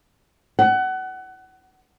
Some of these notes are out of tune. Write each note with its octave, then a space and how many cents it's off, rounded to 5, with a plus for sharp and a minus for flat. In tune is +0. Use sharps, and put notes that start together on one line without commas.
F#5 +25